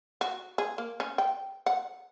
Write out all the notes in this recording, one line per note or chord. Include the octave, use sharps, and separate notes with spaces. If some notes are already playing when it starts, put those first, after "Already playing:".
F#4
G#4
A#3
C#4
G5
F#5